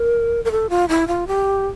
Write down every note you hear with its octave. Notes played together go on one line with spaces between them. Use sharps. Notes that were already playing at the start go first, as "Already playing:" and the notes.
Already playing: A#4
A#4
A4
F4
E4
F4
G4